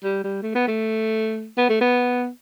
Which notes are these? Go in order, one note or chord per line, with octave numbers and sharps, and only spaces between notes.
G3
G3
A3
B3
A3
B3
A3
B3